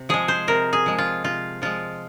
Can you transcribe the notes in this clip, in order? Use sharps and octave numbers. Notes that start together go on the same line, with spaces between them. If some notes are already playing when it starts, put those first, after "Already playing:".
Already playing: C3
F3 G#3 G#4
C5
C3 A#4
G#4
F3 G#3
F4
C3 F4
F3 G#3 F4